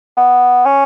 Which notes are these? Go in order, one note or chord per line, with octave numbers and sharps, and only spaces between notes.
B3
C#4